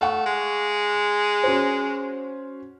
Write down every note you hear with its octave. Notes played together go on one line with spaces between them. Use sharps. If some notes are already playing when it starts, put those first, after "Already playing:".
A3 F5 F#5 C#6
G#3
C#4 F#4 C5